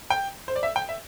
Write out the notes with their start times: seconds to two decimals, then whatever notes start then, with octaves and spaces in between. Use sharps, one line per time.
0.10 G5
0.48 C5
0.56 D5
0.63 E5
0.76 G5
0.89 E5